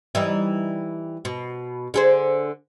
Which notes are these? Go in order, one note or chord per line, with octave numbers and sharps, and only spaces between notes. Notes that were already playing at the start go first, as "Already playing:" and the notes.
E3 G3 D#4
B2
D3 G#4 C5